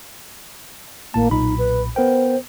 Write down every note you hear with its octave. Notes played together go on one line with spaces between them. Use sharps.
G#1 A2 A#3 A5
B1 A#2 D#4 B5
B4
B3 A#4 C5 G5